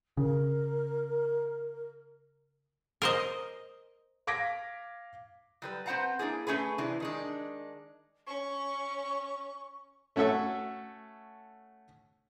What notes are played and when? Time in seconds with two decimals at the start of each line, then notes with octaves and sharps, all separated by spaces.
0.17 C#3 A#4
3.02 A#4 C5 D#5
4.27 F5 D6 G#6 A#6 B6 D7
5.62 F#3 G3 B4
5.86 C4 B4 C5 F#5 A5 A#5
6.19 A#3 D4 E4 G#4
6.47 A3 C#4 G#4 B4
6.78 C3 E3 D4
7.00 D#3 G#3 D4
8.27 C#4 C#6
10.16 A3 C#4 F#4 A4 E5